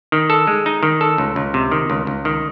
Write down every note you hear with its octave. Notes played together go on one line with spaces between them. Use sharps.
D#3
A4
G#3
D#4
D#3
A4
C#2
C#2
C3
D#3
C#2
C#2
D#3